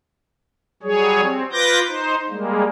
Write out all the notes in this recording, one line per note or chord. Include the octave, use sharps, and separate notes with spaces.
F#3 G3 G#4 C#5
C4
F4 B4 D6 G6 A#6
D#4 C5
G3 G#3 A#3